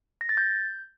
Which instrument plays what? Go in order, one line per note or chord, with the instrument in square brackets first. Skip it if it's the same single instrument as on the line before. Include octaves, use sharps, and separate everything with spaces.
[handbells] A#6
A6
G6